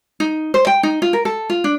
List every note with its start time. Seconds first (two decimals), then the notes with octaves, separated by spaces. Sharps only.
0.20 D#4
0.54 C5
0.67 G5
0.83 D#4
1.02 F4
1.13 A#4
1.25 A4
1.50 F4
1.64 D4